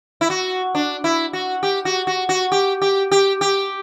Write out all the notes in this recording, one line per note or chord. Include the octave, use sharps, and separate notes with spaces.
E4
F#4
D4
E4
F#4
G4
F#4
F#4
F#4
G4
G4
G4
G4